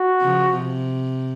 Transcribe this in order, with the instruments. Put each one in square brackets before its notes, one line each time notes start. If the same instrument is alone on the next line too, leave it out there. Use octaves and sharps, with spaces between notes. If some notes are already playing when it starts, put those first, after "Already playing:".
Already playing: [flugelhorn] F#4
[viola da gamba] C#3 F3
C3